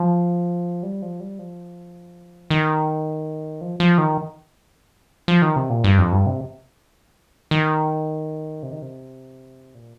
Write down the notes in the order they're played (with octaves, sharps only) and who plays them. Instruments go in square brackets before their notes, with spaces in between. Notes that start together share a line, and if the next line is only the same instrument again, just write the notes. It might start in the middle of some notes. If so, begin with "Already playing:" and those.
Already playing: [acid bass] F3
G3
F3
G3
F3
D#3
F3
F3
D#3
F3
D#3
C3
A#2
G2
F2
G2
C3
D#3
C3
D#3
C3
A#2